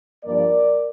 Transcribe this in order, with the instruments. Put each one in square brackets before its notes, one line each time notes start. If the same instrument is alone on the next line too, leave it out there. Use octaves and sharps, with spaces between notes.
[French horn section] G2 F3 A#3 A#4 D5